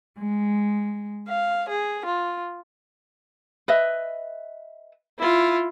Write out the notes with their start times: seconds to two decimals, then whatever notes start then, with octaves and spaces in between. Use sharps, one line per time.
0.18 G#3
1.28 F5
1.68 G#4
2.05 F4
3.68 B4 D#5 E5
5.19 E4 F4